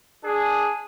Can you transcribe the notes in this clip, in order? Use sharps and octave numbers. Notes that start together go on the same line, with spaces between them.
D4 G#4